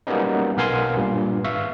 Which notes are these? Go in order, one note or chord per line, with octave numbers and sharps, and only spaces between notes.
F#3 G3 A#3 B3 C#4 D#4
B1 B3 A#4 F5 G#5 C6
G2 A#2
G#1 E5 F5 C#6